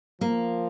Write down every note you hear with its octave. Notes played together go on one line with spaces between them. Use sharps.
F3 A#3